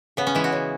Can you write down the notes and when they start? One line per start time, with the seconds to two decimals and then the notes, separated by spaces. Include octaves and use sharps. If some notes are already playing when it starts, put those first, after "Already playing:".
0.17 C#3 B3
0.27 C#4
0.35 E3 G#3 E4
0.44 F#4
0.52 C#3